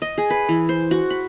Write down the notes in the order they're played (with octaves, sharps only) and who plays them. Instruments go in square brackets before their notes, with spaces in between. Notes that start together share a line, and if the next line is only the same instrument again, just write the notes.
[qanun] D#5
G#4
B4
E3
C5
F#4
B5